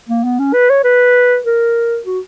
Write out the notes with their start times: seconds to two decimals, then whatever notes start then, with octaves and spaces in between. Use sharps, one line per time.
0.09 A#3
0.24 B3
0.39 C#4
0.53 B4
0.70 C#5
0.84 B4
1.44 A#4
2.05 F#4